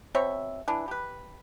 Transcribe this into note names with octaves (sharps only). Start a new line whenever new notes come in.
B2 C4 C#5 E5
E3 D4
G4 B4